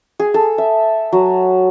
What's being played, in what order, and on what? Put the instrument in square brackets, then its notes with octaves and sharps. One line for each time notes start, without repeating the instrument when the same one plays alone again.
[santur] G#4
A4
E5
F#3